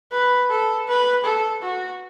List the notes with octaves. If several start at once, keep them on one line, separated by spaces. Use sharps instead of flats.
B4
A4
B4
A4
F#4